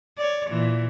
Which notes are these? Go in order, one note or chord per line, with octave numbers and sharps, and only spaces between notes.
C#5 D5
A#2 E3